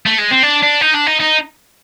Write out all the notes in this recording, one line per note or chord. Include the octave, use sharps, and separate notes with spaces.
A3
G#3
C4
D4
D4
D#4
D4
D#4
D#4